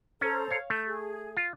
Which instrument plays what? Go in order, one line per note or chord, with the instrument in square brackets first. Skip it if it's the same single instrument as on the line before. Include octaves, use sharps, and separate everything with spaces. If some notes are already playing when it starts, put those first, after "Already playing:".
[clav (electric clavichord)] C#4 [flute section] A4 C5 A#5
[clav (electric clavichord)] C#5 F5
[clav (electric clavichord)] A3 [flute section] G6
[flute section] G#4
[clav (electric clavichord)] F4